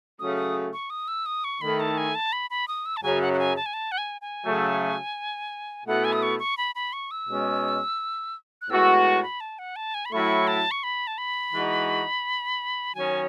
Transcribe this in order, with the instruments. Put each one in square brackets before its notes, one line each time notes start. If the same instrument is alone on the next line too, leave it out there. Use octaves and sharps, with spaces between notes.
[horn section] C#3 F#3 A3 C#4 [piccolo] D#6
[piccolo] D#6
C#6
D#6
E6
D#6
C#6
[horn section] D#3 A3 E4 [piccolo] B5
[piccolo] A5
G#5
A5
B5
B5
D#6
E6
A5
[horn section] F#2 C#3 F#3 [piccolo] G#5
[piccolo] F#5
F#5
G#5
A5
G#5
A5
F#5
G#5
G#5
[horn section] C#3 F#3 A3
[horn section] B2 A3 E4 [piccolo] F#5
[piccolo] G#5
D#6
C#6
C#6
B5
B5
C#6
E6
[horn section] B2 G#3 C#4
[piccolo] F#6
[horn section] A2 G#3 B3 F#4 [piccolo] E6
[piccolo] C#6
B5
A5
F#5
A5
G#5
B5
[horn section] A2 F#3 A3 E4 [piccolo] C#6
[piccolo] A5
C#6
B5
A5
B5
[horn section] E3 G#3 D#4 F#4
[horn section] D#3 F#3 C#4 [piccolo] G#5